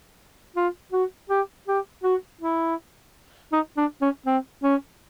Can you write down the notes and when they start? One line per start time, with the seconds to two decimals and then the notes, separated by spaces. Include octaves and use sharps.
0.56 F4
0.92 F#4
1.30 G4
1.68 G4
2.04 F#4
2.41 E4
3.52 D#4
3.77 D4
4.02 C#4
4.26 C4
4.64 C#4